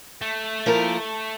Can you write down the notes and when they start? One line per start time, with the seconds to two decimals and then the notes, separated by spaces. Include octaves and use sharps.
0.22 A3
0.66 F3 A#3 E4 A#4